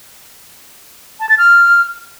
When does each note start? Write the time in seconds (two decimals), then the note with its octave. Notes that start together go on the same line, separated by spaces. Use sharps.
1.20 A5
1.29 A6
1.38 F6